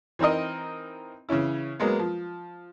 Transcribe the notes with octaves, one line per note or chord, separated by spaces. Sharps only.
E3 C4 D#4 A#4 D#5
C#3 E3 C#4 E4
F#3 G#3 A#3 B3
F3